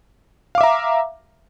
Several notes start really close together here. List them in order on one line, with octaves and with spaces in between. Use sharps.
F5 D6 E5 A#5